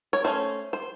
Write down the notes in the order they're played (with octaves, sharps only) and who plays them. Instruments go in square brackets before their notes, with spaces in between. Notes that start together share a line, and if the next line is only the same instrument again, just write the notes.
[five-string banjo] C#5
A3 C#4 C5
C5